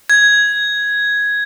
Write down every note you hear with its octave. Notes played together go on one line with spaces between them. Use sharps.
G#6